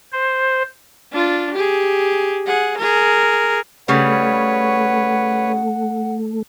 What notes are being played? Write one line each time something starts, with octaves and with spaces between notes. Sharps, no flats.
C5
D4 F4
G4 G#4
G#4 F#5
G#4 A#4
C#3 G3 A3 B4 C#5 F#5